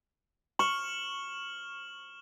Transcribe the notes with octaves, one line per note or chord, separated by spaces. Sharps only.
C#6 F6 E7 F#7